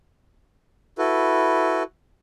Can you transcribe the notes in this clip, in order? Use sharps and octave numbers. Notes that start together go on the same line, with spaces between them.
E4 F#4 A4 B4